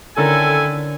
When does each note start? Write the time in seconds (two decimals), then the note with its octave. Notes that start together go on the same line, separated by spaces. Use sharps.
0.17 D3 D#3 C#4 E4 A4 A#4 G#5